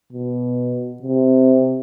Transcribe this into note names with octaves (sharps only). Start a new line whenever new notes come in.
B2
C3